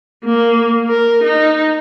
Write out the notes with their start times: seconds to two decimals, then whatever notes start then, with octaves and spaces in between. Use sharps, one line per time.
0.25 A#3
0.88 A#4
1.23 D#4